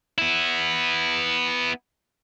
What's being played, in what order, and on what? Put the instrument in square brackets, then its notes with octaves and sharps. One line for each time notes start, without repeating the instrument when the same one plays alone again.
[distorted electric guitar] B3 E4